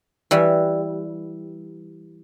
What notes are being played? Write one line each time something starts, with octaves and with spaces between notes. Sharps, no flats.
E3 G3